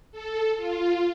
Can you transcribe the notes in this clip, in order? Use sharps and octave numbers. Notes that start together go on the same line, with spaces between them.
A4
F4